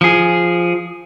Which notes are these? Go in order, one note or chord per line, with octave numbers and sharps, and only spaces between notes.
F3 G#4